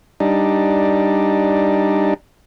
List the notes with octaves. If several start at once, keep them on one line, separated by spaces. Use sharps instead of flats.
G3 D4 D#4